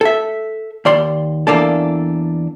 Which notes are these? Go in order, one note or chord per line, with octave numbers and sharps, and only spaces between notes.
A4 E5
D#2 D5 C6
E2 A#3 D4 A4